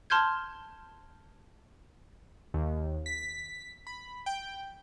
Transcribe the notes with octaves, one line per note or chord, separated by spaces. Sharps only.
A5 C6 F6 G6 G#6
D#2
B6
B5
G5